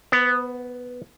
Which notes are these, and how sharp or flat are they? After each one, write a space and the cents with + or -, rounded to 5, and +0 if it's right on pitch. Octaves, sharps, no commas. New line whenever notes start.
B3 +0 C5 -35